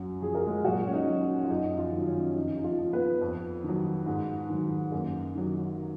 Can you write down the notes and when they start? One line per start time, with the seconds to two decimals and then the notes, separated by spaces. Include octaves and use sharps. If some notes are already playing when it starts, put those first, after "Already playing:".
Already playing: F#2 F#3 F#4
0.22 F3 G#4
0.35 A#4
0.46 G#3 G#4
0.64 A#2 F#3 F#4
0.87 C#4
0.93 D#4
1.07 F#3
1.21 C#4
1.43 F4
1.49 F#2 D#4
1.71 D#4
1.78 F3 F4
1.92 D#3 F#3
2.07 C#4
2.36 F2 D#4
2.58 D#4
2.64 F3 F4
2.78 F3
2.93 B3 B4
3.21 F2
3.63 D#3
3.68 F#3
4.06 G#2
4.49 D#3 F#3
4.92 F#2 A#3 A#4
5.34 D#3 F#3